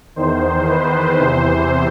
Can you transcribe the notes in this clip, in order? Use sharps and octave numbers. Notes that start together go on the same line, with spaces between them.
E2 D#3 C5
B4
E2 C3 E3 C5